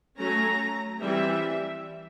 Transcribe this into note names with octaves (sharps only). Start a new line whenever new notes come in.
F#3 A3 C#4 A#5
E3 G3 C4 E5